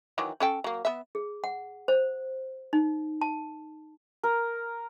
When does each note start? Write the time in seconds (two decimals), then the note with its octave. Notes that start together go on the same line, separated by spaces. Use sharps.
0.18 D#3 E3 F#3
0.40 C#4 A4 G5
0.64 F#3 A#3
0.85 B3 E5
1.15 G#4
1.44 F#5
1.88 C5
2.73 D#4
3.21 A5
4.23 A#4